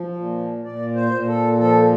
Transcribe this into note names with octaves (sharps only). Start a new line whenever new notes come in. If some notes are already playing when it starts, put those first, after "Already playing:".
Already playing: F3
A#2
A#2 D5
C5
A#2
A4
F3 A4